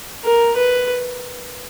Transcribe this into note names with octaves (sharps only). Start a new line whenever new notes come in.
A#4
B4